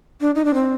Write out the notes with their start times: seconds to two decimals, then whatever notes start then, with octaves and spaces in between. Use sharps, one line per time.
0.21 D4
0.35 D#4
0.45 D4
0.54 C4